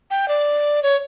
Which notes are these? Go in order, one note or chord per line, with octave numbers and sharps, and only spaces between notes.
G5
D5
C#5